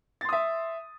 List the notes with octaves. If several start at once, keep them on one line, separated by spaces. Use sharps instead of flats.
E5 C6 D#6 A6